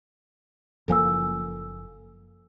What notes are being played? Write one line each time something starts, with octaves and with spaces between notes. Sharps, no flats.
F#1 F3 A#3 A4 G#5 E6